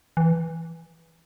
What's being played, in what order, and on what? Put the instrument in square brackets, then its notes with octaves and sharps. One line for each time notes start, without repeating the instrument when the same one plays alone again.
[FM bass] E3